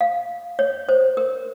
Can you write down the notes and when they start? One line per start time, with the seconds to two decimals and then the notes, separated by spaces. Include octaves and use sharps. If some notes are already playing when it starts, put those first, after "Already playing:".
0.01 F5
0.59 C#5
0.89 C5
1.17 A#4